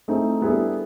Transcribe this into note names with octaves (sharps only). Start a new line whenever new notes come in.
A3 C4 D#4 E4 G#4
G3 B3 D4 E4 G#4 A4